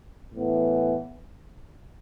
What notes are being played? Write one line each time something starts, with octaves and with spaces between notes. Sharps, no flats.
A2 E3 B3